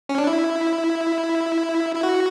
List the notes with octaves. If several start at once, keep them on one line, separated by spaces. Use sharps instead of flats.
C#4
D4
E4
E4
F#4